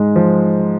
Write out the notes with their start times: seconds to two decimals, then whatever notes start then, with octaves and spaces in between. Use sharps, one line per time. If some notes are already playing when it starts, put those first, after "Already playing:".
Already playing: G#2 G#3
0.16 F3